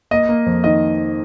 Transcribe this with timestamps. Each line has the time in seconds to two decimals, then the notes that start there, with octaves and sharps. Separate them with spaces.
0.11 A#3 D#5
0.29 A#3
0.46 F2
0.64 D#3 D#5